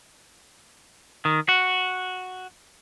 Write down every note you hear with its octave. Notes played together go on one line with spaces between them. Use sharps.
D#3
F#4